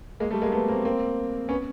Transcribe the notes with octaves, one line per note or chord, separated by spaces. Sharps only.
G#3 A#3
G3 A3
G#3 A#3
A3 B3
A#3 C4
A#3 C4
B3 C#4